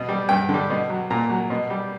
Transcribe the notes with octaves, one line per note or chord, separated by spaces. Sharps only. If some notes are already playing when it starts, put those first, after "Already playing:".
Already playing: B2
G3
G2 G5
D3
G3
B2
F#3
A#2 A#5
F#3
B2
G3